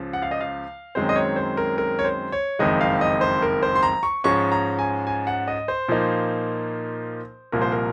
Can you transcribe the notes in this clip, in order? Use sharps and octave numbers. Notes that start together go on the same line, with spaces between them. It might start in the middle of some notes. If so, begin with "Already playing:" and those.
Already playing: C#2 C#3 F3
F#5
F5
D#5
F5
F#2 D#3 G#3 C4 C5
D#5
C#5
C5
A#4
A#4
C#5
C5
C#5
F#1 F2 D#3 G#3 D#5
F5
D#5
C5
A#4
C5
C6
A#5
C#6
G#2 F3 G#3 C#4 C#6
A#5
G#5
G#5
F#5
D#5
C5
A#2 F3 A#3 D#4
C2 A#2 F3 A#4
C5
A#4